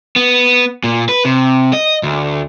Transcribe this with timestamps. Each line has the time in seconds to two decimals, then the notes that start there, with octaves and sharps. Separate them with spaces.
0.16 B3
0.84 A#2
1.09 B4
1.25 C3
1.73 D#5
2.03 D2